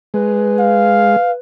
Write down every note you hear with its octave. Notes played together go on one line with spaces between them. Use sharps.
G#3 B4
F5